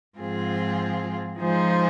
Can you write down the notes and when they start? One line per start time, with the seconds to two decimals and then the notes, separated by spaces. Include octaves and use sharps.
0.18 G#2 F3 C4 F4 G#4
1.38 F3 G#3 D#4 G#4 C5